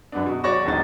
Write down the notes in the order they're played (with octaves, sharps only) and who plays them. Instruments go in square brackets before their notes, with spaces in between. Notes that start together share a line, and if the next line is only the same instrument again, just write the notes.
[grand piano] F#2 B3 D4
B2
F#3 C#5 D5 C#6 A#6 E7
D1 G#1 C#2 D#4 A6